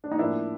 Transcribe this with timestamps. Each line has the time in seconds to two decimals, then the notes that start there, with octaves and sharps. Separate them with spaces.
0.04 D4
0.12 D#4
0.18 A2 F3 A#3 D4 E4